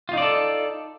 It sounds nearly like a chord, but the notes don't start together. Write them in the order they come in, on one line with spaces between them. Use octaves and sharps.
F4 D#4 D5 A4